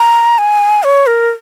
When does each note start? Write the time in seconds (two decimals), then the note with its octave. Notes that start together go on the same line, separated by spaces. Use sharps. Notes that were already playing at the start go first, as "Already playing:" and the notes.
Already playing: A#5
0.38 G#5
0.83 C#5
1.07 A#4